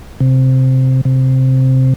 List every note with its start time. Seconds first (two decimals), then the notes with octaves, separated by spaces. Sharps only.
0.21 C3
1.05 C3